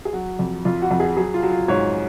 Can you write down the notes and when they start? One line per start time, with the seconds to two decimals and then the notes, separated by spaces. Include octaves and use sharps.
0.05 G#4
0.13 F#3 F#4
0.39 F2
0.65 F2 F4
0.82 F#4
0.91 F2
1.00 G#4
1.17 F#3 G#4
1.34 F4
1.42 F#3
1.51 F4
1.68 G#2 C#5